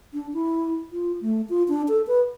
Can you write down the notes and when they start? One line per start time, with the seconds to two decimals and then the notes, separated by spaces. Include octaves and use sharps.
0.14 D4
0.33 E4
0.92 F4
1.21 A3
1.49 F4
1.68 D4
1.89 A4
2.07 B4